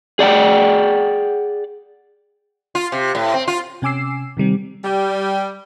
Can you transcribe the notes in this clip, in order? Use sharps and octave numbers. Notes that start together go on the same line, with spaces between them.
G#4 D5 F#5 G5
F4
C3
A2
C4
F4
C3 C#4 G#5 D6 E6 C7
C3 D#3 G3 C4
G3